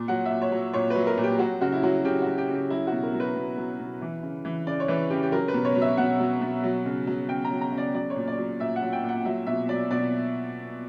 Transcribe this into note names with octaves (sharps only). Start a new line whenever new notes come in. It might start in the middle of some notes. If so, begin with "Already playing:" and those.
Already playing: A#2
F#3 F#5
A#2 E5
C#5
F#3
A#2 C#5
F#3 B4
A#4
A#2
G4
F#3 F#4
C#3 F#4
E4
F#3 F#4
C#3 G4
F#3 F#4
G4
C#3
G4
F#3 E4
F#4
B2
A#4
F#3
B4
B2
F#3
B2
E3
C#3
E3
C#3 D5
C#5
E3 B4
C#3 G4
G4
F#3 A#4
B4
B2
C#5
F#3
E5
B2 F#5
F#3
B2
F#3
C#3
F#3
C#3 G5
A#5
F#3
A#5
C#3
D5
F#3 D5
C#5
A#2
D5
F#3
A#2 E5
F#5
F#3
G5
A#2
F#5
F#3 E5
B2 E5
F#3 D5
B2 D5